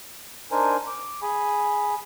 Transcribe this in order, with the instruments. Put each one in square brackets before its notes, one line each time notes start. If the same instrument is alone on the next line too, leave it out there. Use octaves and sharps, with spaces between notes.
[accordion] D4 D#4 A#4 C5 G#5
D6
G#4 G#5 B5